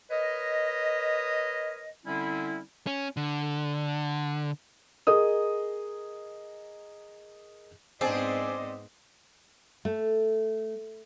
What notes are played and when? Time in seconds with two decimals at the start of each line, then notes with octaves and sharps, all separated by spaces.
0.10 A#4 B4 C#5 D#5
2.05 D3 G3 C4 C#4 E4
2.87 C#4
3.17 D3
5.07 G#4 A#4 D#5 D#6
8.01 G#2 B3 C4 D4 G#4 C5 D5 D#5
9.85 A3